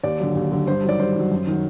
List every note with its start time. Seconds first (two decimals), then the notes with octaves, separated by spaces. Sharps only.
0.03 D#2 D5
0.20 D3 F#3
0.35 D#2
0.52 D3 F#3
0.67 G2 C5
0.84 D#3 F#3 D5
0.99 G2 C5
1.16 D#3 F#3
1.31 F#2
1.47 D#3 F#3